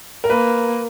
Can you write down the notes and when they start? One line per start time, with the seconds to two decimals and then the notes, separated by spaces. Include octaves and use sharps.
0.24 A#4
0.30 A#3 B4